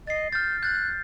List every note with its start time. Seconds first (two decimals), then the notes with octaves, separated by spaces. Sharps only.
0.07 D#5 A6 C7
0.32 F6 G6 A6
0.63 F#6 G6 A6